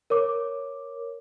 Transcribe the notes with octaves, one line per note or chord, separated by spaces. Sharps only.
A#4 C#5 D6